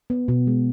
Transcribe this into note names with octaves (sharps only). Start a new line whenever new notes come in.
B3
B2
G#3